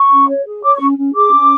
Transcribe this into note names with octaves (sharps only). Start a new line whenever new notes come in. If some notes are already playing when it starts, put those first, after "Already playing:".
Already playing: C#6
C#4
C#5
G#4
C#5 D6
C#4 C#6
C#4
G#4 D6
C#4